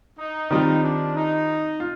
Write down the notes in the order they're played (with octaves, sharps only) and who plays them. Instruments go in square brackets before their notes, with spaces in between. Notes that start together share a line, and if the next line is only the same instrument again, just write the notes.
[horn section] D#4
[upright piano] D#3 G3 C4 F4 [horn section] D#4
[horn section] D4
D#4
[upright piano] F4